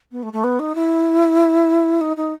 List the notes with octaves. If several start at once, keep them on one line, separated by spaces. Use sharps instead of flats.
B3
A3
A3
B3
D#4
E4
D#4
D#4